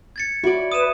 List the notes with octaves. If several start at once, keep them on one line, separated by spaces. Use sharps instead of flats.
G#6 A6 C#7
E4 F#4 D5
B4 D#6 D#7 E7